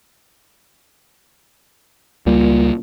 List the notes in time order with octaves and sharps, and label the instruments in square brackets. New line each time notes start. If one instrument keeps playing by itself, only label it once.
[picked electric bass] C#2 G3 [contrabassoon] A#2